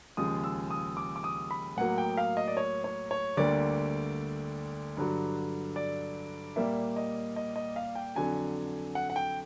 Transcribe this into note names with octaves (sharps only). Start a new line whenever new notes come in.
D#2 C#3 F3 G#3 D#6
E6
D#6
D6
D6
D#6
B5
A2 F#3 A#3 F#5
G5
F5
D#5
D5
C#5
C#5
C#5
D2 D3 G3 A#3 D5
G2 D3 F#3
D5
A#2 G3 A#3 E5
D#5
D#5
D#5
F5
G5
F2 D3 F#3 G#5
F#5
F#5
G5